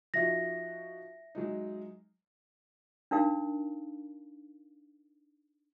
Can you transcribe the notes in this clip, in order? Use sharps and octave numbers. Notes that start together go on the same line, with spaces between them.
F3 D#4 F#4 E5 A#6
F#3 G#3 D#4
D4 D#4 A#4 F5